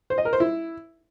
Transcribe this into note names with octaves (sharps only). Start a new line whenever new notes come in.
C5
D#5
A#4
C5
E4